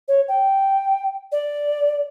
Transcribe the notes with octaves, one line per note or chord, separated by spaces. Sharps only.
C#5
G5
D5